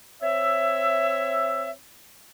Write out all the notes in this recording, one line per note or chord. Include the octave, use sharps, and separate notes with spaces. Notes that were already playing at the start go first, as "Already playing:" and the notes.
C4 C#5 E5